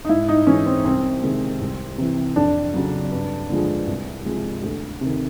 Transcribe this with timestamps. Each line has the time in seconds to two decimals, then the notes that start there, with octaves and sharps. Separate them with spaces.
0.05 D#4
0.09 G#2 E4
0.28 D#4
0.47 E3 G#3 C#4
0.66 C4
0.85 C2 C4
1.23 C3 D#3 G#3
1.61 C2
1.98 C3 E3
2.36 F2 D4
2.74 C#3 F#3
3.11 G2
3.49 D3 F3 G#3
3.87 C2
4.25 C3 F3 G#3
4.63 D2
5.01 C3 D#3